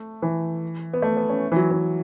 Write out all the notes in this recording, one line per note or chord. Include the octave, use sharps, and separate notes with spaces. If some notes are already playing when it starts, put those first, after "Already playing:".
Already playing: A3
E3
B3
A3
B3
C#4
E3
F#3
E3